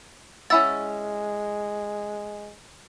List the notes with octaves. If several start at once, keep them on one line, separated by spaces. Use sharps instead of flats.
G#3 C#4 E4 F#5 E6 A6